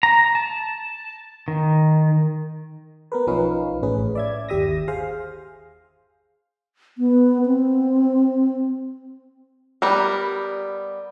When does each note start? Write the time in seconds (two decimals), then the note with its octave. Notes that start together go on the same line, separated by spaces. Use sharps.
0.03 A#5
0.35 A5
1.48 D#3
3.12 B3 A#4 B4
3.27 B1 F3 C#4 D#4 B4 F5
3.83 A1 A2 C#4 G#4 B4
4.15 D5 E5 G#6
4.49 G1 D#2 G4 E5 D#6 A#6
4.88 G#4 C5 F5
6.98 B3
7.45 C4
9.82 G3 B3 A#4